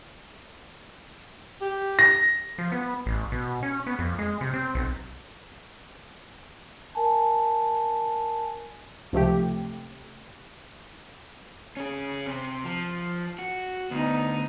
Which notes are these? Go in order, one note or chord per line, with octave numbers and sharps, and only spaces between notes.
G4
A#6
F3
B3
A1
B2
C#4
B3
F2
G#3
C3
C4
B1
A#4 G#5 A5
C#2 C3 F3 A3 G4
C#4 G#4
C3
F3
F#4
D2 B3 D#4